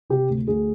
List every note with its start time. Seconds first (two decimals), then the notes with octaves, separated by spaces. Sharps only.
0.10 C3 G4
0.30 D2
0.47 D2 G#4